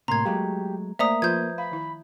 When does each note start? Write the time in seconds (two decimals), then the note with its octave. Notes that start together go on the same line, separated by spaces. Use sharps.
0.08 A2 C3 A#3 A#4 A#5 C6 G#6
0.25 F#3 G#3 A3 G4 F5
0.99 A3 A#3 C5 D5 E5 A#5 D#6
1.22 F3 F4 B4 C5 G6 G#6
1.58 F5 B5
1.71 D#3 E4